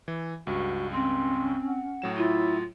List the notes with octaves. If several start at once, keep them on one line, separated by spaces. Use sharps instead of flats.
E3
C#2 G2 F#4
C4 C#4 C6
F#5
A2 F#3 E7
E4 F4